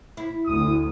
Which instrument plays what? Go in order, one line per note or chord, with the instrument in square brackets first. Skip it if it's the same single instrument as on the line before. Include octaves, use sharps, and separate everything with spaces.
[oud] E4
[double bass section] D2 [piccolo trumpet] D#6